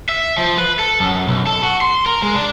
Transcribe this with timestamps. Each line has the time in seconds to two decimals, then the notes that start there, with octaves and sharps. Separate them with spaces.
0.09 E5
0.38 F3
0.58 B4
0.79 A4
1.00 F#2
1.27 B1
1.47 A4
1.63 F#4
1.81 C6
2.06 A#4
2.22 G#3
2.35 D4